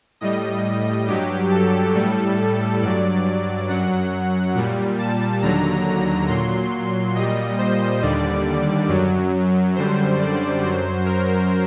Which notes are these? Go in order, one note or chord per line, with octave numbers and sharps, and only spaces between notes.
A2 G3 D#5
G2 F#3 G4
A4
A2 G3
G2 F#3 D5
F#2 F#3 F#5
A#2 G3
A5
D#2 D3 F#3 A#5
A#2 F#3 C6
A#2 G3 D#5
C5
D#2 D3 G3 D5
F#2 F#3
F#2 D3 G3 C5
D5
F#2 F#3 C5
A#4